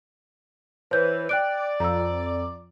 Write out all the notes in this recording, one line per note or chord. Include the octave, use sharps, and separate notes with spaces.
E3 C5 C#5 G6
D5 G5 F#6 D7
F2 A#5 E6